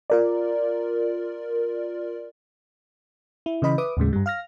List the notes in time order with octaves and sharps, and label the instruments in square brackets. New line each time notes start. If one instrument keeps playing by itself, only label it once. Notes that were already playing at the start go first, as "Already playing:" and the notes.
[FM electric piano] F4 A#4 D5
E4
C#3 E3 D#5 B5
B4 E5 D6 D#6
D#2 A2 C#3 G#3
G2 G3
F5 F6 A#6